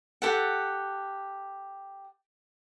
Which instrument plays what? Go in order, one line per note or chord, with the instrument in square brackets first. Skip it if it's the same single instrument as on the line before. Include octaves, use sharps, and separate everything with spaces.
[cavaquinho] G4 A4 F#5